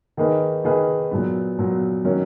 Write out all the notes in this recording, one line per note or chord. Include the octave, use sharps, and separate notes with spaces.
D#3 A#3 D#4 G#4 B4
D#3 A#3 D#4 G#4 B4
A#2 F#3 B3
A#2 F#3 B3
D#3 F#3 A#3 C#4